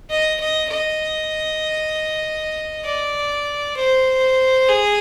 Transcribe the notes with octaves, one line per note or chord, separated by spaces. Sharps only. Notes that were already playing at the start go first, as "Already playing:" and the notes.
D#5
D#5
D#5
D5
C5
G#4